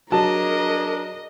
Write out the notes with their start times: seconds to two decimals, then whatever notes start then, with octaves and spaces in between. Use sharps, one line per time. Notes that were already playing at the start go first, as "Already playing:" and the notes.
0.12 F#3 D4 G#4 A#4 D#5 A5